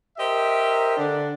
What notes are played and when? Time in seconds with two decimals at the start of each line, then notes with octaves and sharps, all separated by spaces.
0.18 G4 A#4 C5 D#5 E5
0.97 D3 D4